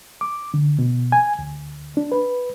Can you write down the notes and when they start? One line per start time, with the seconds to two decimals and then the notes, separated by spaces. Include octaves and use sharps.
0.21 D6
0.54 D3
0.79 B2
1.12 G#5
1.39 D2
1.97 D4
2.12 B4